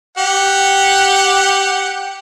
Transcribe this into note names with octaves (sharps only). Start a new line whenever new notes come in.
G4 F#5